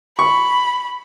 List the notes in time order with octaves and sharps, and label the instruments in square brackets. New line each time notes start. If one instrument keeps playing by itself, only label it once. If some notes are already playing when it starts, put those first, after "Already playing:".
[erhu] B5 [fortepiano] C#6